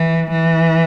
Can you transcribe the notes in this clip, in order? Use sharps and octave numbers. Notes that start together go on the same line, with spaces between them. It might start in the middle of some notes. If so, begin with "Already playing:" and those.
Already playing: E3
E3